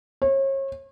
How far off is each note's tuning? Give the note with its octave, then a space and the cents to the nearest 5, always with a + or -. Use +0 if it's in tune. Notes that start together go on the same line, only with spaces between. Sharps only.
C#5 -35